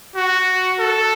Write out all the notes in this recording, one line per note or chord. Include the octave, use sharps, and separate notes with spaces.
F#4
A4